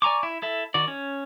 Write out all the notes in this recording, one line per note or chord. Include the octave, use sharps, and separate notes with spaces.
D5 G#5 A#5 C#6 D6
E4
E4 A4 E5
D#3 F#4 D5
C#4